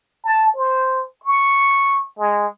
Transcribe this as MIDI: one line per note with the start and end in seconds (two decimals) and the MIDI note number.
0.25 0.48 81
0.56 1.04 72
1.24 2.03 85
2.19 2.47 56